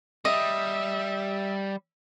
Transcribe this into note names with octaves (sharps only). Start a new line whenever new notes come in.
G3 D#5 E5